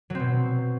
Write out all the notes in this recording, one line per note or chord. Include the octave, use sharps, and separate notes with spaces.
B2 F#3 C4